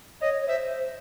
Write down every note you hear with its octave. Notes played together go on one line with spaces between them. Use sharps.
C#5 D#5
C#5
C5 E5